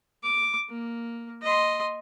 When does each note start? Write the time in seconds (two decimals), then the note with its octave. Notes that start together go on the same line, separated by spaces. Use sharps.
0.23 D6
0.70 A#3
1.42 D#5 C6